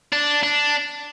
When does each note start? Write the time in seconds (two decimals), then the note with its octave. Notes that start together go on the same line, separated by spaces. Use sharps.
0.13 D4
0.43 D4